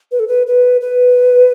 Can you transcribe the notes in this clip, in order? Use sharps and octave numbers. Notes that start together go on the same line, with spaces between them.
B4
A4
B4
B4
B4